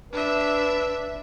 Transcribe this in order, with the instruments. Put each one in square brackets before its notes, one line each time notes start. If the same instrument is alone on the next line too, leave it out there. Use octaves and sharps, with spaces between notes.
[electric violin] D4 E5 [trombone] B4